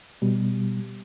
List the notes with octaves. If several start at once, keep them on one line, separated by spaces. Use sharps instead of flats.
B2 G3